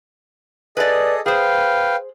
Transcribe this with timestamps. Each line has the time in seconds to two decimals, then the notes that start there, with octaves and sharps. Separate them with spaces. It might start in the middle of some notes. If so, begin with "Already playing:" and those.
0.77 G#4 A4 B4 D5 D#5
1.26 G#4 B4 C5 F5 G5